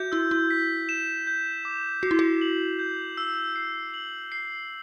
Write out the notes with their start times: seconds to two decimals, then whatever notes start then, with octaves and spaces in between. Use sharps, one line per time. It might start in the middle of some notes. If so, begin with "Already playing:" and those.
Already playing: F#4 E5 G6
0.12 E4 E6
0.31 E4
0.50 B6
0.89 E7
1.27 G6
1.65 D6
2.03 F#4 C7
2.11 E4
2.19 F#4
2.41 F#7
2.79 G6
3.18 E6
3.56 C7
3.94 F#7
4.32 C7